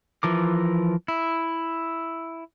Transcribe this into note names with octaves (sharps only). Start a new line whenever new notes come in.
E3 F3 A#4 D6
E4